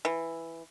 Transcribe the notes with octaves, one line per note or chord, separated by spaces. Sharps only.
E3